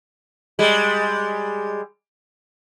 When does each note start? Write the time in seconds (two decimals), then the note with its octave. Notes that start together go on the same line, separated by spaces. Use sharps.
0.59 G3 G#3